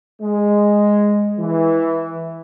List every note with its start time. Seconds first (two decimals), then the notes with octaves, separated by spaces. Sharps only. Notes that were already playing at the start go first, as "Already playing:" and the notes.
0.21 G#3
1.39 E3